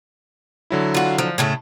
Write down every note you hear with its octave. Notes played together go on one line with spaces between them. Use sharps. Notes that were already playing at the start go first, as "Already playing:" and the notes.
D3 F#3 E4
F4 F#4
F3
A2 C#3 A3